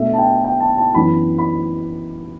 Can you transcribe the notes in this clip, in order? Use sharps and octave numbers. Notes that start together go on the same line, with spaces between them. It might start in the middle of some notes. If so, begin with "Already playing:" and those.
Already playing: B2 A3 D4 E5
A5
G5
G5
A5
A5
F#2 E3 B3 D4 B5
B5